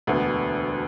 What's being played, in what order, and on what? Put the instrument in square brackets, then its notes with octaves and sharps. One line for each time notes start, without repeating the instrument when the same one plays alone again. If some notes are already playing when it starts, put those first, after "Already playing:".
[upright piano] E1 D2 D3 B3